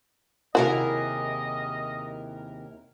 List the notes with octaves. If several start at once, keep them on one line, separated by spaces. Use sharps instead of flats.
D#2 C3 E4 F#4 G#4 A#4 D#5 F#5